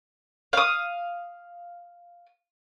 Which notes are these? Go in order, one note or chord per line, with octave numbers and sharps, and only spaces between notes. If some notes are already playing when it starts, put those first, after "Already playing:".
F5 D#6